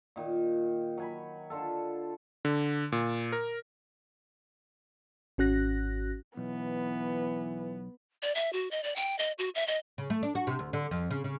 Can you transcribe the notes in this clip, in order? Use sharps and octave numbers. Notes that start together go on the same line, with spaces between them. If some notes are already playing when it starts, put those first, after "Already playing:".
A#2 D#3
F#3 G#5 B5
D3 F4 A4
D3
A#2
A#4
G#1 C#4 F#4 F#6 A#6
B1 E3 B3
D5
E5
F#4
D#5
D5
G5
D#5
F#4
E5
D#5
C#3
A3
D4
F#4
C3
D2
D3
F2
C#3
C#3